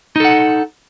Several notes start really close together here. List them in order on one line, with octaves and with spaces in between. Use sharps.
D#4 A4 F#5